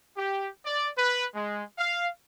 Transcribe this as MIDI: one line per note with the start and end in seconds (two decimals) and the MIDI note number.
0.17 0.49 67
0.65 0.89 74
0.97 1.26 71
1.35 1.63 56
1.78 2.08 77